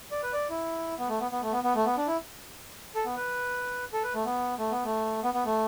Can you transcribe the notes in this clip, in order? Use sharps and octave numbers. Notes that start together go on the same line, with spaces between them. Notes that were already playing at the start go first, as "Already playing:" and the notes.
D5
B4
D5
E4
B3
A3
B3
B3
A3
B3
B3
A3
B3
D4
E4
A4
B3
B4
A4
B4
A3
B3
A3
B3
A3
B3
B3
A3